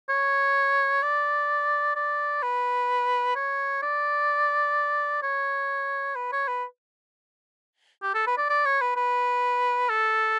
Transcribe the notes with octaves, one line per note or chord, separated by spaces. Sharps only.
C#5
D5
D5
B4
C#5
D5
C#5
B4
C#5
B4
G4
A4
B4
D5
D5
C#5
B4
B4
A4